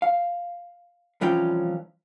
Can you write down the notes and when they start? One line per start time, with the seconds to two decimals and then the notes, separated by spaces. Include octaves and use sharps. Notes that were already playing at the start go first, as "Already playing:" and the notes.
0.02 F5
1.21 C2 E3 F3 C#4 F4 G5